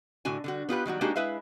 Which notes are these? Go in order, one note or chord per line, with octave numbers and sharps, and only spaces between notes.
A2 D3 F#4 G#5
D3 G3 F#4
B3 F4 G4 B4
D#3 F#3 G3 F#4
G#3 A#3 D4 D#4 F#4 G4
G#3 E4 B4 E5 F5